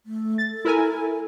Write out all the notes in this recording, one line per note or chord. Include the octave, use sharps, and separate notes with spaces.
A3
A6
A4
E4 A#4 G#5